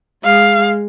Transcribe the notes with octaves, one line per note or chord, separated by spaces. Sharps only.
G#3 F5